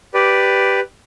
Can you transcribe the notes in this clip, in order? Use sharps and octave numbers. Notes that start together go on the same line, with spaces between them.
G4 B4 D5